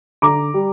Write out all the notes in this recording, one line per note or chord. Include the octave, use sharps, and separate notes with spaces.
D3 A#5 D6
G3